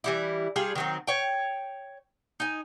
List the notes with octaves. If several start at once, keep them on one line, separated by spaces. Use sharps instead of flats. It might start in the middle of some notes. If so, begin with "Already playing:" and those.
E3 G3 E4
G3 D4 F4 G#4
D#3 F#3 C4
C#5 G5
D#4 G#5